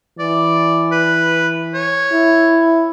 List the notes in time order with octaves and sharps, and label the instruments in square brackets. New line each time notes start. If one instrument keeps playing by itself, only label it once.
[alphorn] E3 [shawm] D5
[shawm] B4
C#5
[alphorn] E4